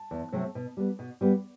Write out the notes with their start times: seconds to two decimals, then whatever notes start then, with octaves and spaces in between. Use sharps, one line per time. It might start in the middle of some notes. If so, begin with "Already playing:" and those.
Already playing: A5
0.11 E2
0.32 C3 F#3 A3 C4
0.55 B2
0.77 G3 B3
0.99 B2
1.21 G3 B3